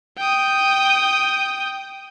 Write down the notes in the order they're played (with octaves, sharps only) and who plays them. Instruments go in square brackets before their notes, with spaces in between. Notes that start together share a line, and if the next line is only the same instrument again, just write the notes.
[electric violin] G5 D#6